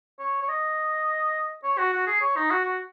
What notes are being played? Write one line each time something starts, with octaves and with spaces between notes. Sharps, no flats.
C#5
C#5
D#5
C#5
F#4
F#4
G#4
C#5
D#4
F#4
F#4